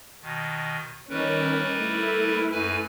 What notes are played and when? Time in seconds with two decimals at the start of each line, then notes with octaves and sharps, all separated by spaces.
0.22 B2 D#3
1.09 D#3 G3 C#4 A#4 B4
1.78 A3 E4
2.52 F#2 B4 G#5